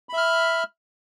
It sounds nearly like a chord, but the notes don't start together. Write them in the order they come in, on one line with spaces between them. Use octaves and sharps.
B5 E5 F6